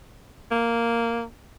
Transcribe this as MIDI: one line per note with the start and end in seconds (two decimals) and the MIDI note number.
0.51 1.22 58